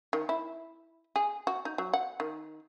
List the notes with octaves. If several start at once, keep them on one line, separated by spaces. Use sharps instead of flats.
D#3
E4
G#4
F#4
D#4
F#3
F#5
D#3